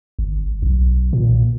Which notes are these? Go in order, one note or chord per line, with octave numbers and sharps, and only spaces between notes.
G1
B1
A#2